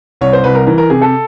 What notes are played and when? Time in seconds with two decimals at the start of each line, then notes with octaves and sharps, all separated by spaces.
0.21 C2 C#5
0.33 C5
0.44 C2 B4
0.55 A#4
0.67 E3 A#4
0.78 A#4
0.90 C3 G#4
1.01 A4